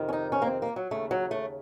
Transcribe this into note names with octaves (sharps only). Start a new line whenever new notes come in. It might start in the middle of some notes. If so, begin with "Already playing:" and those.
Already playing: F2 C3 D#3
C#4
D#4
C#4
A#3
C4
A#3
F#3
D#2 C#3 A3
F#3
A3